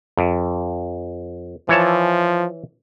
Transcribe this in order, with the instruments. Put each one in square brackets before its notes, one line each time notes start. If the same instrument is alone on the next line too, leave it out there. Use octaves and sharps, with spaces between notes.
[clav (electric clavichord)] F2
[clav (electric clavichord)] E3 C#5 A5 [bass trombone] F3